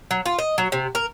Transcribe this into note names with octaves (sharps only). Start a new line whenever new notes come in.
F#3
F4
D#5
F#3
C3
A#4